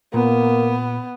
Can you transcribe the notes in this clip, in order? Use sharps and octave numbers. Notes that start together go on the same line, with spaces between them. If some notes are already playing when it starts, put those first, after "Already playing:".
A#2 A#3 B3